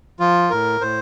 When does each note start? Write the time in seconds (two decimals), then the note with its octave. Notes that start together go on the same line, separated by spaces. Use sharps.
0.20 F3 F4
0.50 A2 A#4
0.81 A2 C5